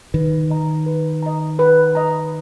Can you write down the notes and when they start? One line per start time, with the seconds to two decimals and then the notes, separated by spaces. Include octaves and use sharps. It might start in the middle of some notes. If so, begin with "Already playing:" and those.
0.14 D#3 B4
0.50 D#5 A#5
0.86 B4
1.23 D#5 A#5
1.59 B4
1.95 D#5 A#5